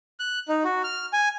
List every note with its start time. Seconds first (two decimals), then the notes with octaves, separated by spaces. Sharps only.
0.20 F#6
0.48 D#4
0.64 F#4
0.84 F6
1.13 G#5